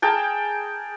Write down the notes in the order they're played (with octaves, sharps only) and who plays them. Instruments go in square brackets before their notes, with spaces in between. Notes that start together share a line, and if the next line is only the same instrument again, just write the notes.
[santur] G#4 A#4 G5 A5